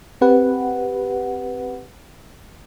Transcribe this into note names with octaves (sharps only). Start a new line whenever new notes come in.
C4 G4 B4 F#5